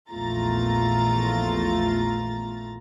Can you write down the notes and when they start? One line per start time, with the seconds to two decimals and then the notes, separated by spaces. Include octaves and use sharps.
0.10 A#1 E2 A3 F4 A#5 A6